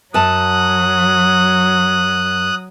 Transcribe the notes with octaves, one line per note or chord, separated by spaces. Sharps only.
F#2 F#3 A5 D#6 F#6